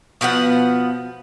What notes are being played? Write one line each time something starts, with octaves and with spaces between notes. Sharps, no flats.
B2 F3 B3 F#5